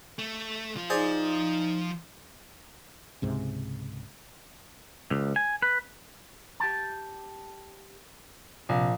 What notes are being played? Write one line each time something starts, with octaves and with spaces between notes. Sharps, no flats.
A3
F3 F4
D#4 G#4 C5 D5
C#2 G#2 C3
C#2
G#5
B4
G4 G5 A5
A#1 C3